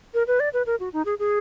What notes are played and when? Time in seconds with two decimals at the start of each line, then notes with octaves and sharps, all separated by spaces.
0.14 A#4
0.27 B4
0.40 D5
0.53 B4
0.66 A#4
0.80 F#4
0.93 D#4
1.05 G#4
1.19 G#4